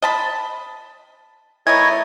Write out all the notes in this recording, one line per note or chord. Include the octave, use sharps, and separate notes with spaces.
D#5 A5 B5
E3 A3 E4 A#4 C#5 D#5 G#6